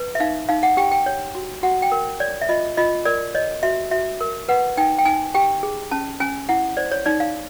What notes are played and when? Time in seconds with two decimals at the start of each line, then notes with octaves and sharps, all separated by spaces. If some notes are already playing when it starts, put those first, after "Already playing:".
Already playing: B4
0.15 E5
0.20 D#4 F5
0.49 D#4 F5
0.63 F#5
0.77 G4 G5
0.91 G5
1.06 C#5
1.35 F#4
1.63 F#4 F#5
1.82 G5
1.92 A#4
2.20 C#5 D5
2.42 E5
2.49 F4 D#5
2.77 F4 D#5
3.05 A#4 D5
3.35 C#5 D#5
3.63 F#4 E5
3.91 F#4 E5
4.21 A#4
4.49 B4 F#5
4.77 D#4 G5
4.98 G5
5.05 D#4 G#5
5.34 G4 G5
5.63 G#4
5.91 C#4 A5
6.20 C#4 G#5
6.49 E4 F#5
6.77 C5 D5
6.92 C#5
7.06 D#4 D5
7.20 F5